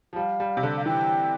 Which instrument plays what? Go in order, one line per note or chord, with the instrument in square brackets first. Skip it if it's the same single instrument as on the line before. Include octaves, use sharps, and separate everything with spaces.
[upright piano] F3
[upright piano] G3 [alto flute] F5
[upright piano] G3
C3
D3
[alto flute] F5
[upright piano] E3 [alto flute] G5